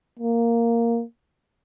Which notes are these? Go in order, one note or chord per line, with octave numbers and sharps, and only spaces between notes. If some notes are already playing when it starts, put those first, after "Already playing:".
A#3